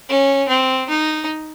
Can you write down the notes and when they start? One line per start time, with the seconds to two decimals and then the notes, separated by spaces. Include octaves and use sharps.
0.09 C#4
0.49 C4
0.89 D#4